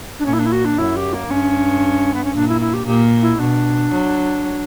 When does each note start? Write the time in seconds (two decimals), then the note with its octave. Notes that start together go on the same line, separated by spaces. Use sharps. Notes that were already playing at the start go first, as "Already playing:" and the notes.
0.19 D4
0.25 A#2 C#4
0.33 E4
0.39 D4
0.45 E4
0.52 F#4
0.65 D4
0.78 F#2 E4
0.96 G4
1.13 A#3
1.30 G2 C#4
2.14 B3
2.24 C#4
2.34 A#2 D4
2.48 E4
2.60 E4
2.73 G4
2.86 A#2 G4
3.21 E4
3.39 B2 D4
3.92 F#3